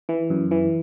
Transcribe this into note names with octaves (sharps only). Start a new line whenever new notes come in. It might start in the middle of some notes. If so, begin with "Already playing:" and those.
E3
F#2
E3